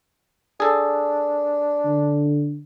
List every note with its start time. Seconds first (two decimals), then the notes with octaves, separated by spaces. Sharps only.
0.60 D4 G#4 A4
1.85 D3